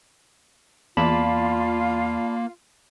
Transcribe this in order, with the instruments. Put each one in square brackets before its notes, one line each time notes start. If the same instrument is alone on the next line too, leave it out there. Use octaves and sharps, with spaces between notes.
[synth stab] E2 [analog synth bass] A#3 [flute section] F4 [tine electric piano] D5 A5 B5